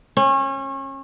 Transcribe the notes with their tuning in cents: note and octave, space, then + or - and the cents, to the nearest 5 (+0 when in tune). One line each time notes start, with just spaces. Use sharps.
C#4 -30